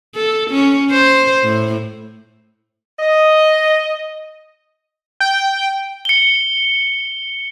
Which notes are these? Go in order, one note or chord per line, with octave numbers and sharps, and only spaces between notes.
A4
C#4
C5
A2
D#5
G5
C#7 G7